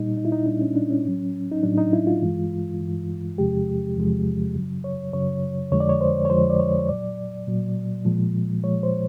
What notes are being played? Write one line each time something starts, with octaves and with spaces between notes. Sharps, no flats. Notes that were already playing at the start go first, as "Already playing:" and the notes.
Already playing: A#2 G3 D#4
D#4
E4
D#4
A#2 G3 D4
C#4
D4
C#4
A2 F#3
D#4
A2 F#3 D4
D#4
E4
F4
G2 E3 G#3
G2 E3 G#3
E2 C3 F3 G#3 G4
E2 C3 F3 G#3
F#2 C#3 F#3
C#5
F#2 C#3 F#3 C#5
F2 D3 F3 G#3 C#5
D5
C#5
C5
C#5
F2 D3 F3 G#3 C5
D5
C#5
C#5
A#2 F#3 D5
A#2 F#3
A#2 F3 G#3
A#2 F3 G#3 C#5
C5